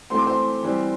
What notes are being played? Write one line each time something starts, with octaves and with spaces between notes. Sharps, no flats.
E3 A3 C4 C6
D6
C5 C6
E3 G3 C4